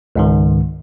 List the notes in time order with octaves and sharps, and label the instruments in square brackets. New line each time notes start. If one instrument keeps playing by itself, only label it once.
[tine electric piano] C#2 G#2 D#3